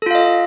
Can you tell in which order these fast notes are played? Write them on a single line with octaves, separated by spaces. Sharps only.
A4 F4 F5 D#5